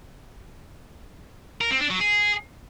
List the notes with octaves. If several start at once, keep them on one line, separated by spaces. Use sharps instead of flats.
A#4
C4
D4
F#3
G#4